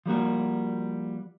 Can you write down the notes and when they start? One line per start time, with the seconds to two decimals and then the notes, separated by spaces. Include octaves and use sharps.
0.06 F3 G3 A#3 F#4